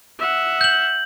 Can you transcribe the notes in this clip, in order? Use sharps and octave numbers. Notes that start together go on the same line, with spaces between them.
E5 F#5
G6 F#7